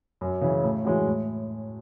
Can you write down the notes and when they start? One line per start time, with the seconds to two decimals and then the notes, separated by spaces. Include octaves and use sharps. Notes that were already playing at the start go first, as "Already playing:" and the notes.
0.21 F#2
0.41 C#3 E3
0.63 A2
0.85 E3 G#3 C#4 F#4
1.06 A2